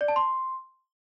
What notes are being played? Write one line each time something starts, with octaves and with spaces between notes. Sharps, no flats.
D5
A5
C6